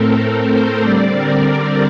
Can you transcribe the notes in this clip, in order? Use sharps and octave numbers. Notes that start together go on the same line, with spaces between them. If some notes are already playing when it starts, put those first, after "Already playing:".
Already playing: A2 A3 C4 A4 A#4
A#4
C5
D3 G3 C4 D5
A#4